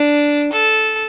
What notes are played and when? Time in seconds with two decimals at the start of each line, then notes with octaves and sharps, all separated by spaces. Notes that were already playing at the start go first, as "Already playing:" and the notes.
Already playing: D4
0.52 A4